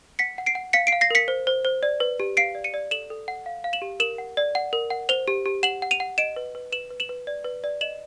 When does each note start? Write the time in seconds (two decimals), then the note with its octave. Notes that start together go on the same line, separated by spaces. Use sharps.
0.19 F#5 B6 C#7
0.38 F#5
0.46 C7 D7
0.55 F#5
0.73 F5 B6 C#7
0.87 C7 D7
0.93 F5
1.01 A#6 C7
1.11 A#4 B6 C#7
1.28 C5
1.47 C5
1.65 C5
1.83 D5
2.00 B4
2.20 G4
2.37 F5 C7 D7
2.55 D5
2.64 C#7 D#7
2.74 D5
2.91 A4 E7 F#7
3.10 A4
3.28 F#5
3.46 F5
3.64 F5
3.73 E7 F#7
3.82 G4
4.00 A#4 E7 F#7
4.18 F#5
4.37 D5
4.55 F#5
4.73 A#4
4.90 F#5
5.09 C5 F7 G7
5.28 G4
5.46 G4
5.63 F#5 E7 F#7
5.82 F#5
5.91 D#7 F7
6.00 F#5
6.18 D#5 D7 E7
6.36 B4
6.55 B4
6.72 B4 E7 F#7
6.91 B4
7.00 E7 F#7
7.09 B4
7.27 D5
7.45 B4
7.64 D5
7.81 D#5 E7 F#7